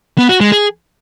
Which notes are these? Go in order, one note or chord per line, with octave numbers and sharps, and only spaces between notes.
B3
F#4
G#3
G#4